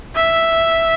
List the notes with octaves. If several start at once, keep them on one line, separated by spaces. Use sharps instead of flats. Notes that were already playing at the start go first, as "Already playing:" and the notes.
E5